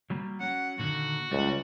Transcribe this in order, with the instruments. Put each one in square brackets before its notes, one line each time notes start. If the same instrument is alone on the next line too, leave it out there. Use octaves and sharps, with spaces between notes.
[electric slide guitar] F#3 G3 A#3
[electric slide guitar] F#3 C#4 [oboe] F#5
[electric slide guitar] A#2 D3 D#3 [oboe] F#4
[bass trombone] C#2 [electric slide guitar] G3